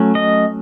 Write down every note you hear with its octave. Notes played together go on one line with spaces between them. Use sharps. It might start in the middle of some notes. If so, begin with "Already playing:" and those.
Already playing: F#3 A3 C#4
D#5